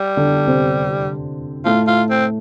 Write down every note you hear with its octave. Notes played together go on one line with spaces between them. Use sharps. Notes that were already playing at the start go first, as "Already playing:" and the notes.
Already playing: G3
D3 D4
C3 C4
A2 A3 F4
F4
C4